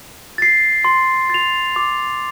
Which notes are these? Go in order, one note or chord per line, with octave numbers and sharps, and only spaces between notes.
A6 C7
C6
A6 F7
D6